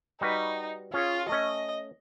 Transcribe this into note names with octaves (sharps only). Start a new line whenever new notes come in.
G3 D#4 F#4 B4
C#4 F4 G#4 C#5
A3 C#4 D#5